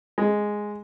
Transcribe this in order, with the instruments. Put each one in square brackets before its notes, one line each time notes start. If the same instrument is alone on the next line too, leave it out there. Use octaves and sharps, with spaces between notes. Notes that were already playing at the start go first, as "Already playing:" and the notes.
[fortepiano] G#3